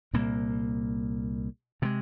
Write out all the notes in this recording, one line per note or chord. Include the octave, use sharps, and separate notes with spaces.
C2 A#2 A#3
C3 F3 G#3